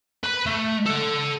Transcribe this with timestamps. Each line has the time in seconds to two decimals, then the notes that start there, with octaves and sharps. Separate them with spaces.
0.24 B4 B5
0.46 A3
0.86 A4 F#5